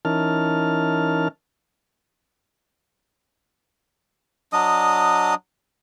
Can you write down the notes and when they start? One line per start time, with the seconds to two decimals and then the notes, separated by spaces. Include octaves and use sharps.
0.05 E3 C#4 D#4 A#4 A5 F6
4.53 F#3 D4 D#5 D#6